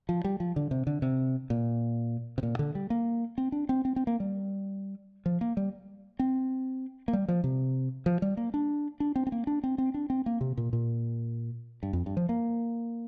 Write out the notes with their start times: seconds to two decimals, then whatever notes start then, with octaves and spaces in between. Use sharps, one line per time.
0.09 F3
0.25 G3
0.40 F3
0.56 D3
0.71 C3
0.87 D3
1.02 C3
1.50 A#2
2.38 C3
2.43 A#2
2.59 D3
2.75 G3
2.90 A#3
3.38 C4
3.52 D4
3.69 C4
3.85 C4
3.96 C4
4.07 A#3
4.20 G3
5.26 F3
5.41 A#3
5.57 G3
6.19 C4
7.08 A#3
7.13 G3
7.28 F3
7.44 C3
8.06 F3
8.22 G3
8.37 A#3
8.54 D4
9.00 D4
9.16 C4
9.27 C4
9.32 A#3
9.47 D4
9.64 C4
9.78 C4
9.94 D4
10.10 C4
10.26 A#3
10.41 C3
10.57 A#2
10.73 A#2
11.83 G2
11.93 F2
12.06 G2
12.17 F3
12.29 A#3